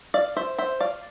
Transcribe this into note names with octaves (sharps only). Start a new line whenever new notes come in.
D5 F5
C5 E5
C5 E5
D5 F5